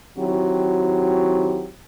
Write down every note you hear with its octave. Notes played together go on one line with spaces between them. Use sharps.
D#3 F#3 C4 E4 F#4 G4